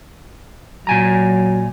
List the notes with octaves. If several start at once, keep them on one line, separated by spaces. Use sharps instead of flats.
A#2 F#3 G#5 A#5